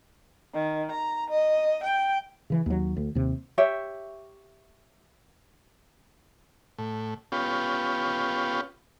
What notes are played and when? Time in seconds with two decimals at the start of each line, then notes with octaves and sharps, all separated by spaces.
0.54 D#3
0.91 A#5
1.30 D#5
1.83 G5
2.50 C#3 E3
2.66 D#2 F#3
2.97 D2
3.15 D#2 C3
3.58 G4 C#5 E5
6.78 A2
7.32 B3 C#4 F4 G4